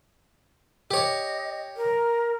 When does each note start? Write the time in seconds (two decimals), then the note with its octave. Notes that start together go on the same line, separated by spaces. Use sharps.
0.91 G4 C#5 D#5
1.76 A#4